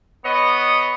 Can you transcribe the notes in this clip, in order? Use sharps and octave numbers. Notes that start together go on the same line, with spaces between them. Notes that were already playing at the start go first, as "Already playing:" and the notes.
B3 C#5 D#5